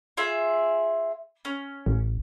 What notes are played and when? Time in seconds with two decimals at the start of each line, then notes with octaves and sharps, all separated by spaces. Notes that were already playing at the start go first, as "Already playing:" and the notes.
0.17 F4 G#4 E5
1.45 C#4
1.86 A1